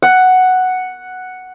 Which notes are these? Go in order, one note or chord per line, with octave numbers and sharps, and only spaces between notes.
F#5